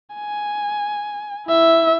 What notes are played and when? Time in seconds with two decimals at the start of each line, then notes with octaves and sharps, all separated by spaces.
0.15 G#5
1.47 E4 E5